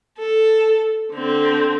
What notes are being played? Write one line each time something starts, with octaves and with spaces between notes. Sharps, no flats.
A4
D3 C4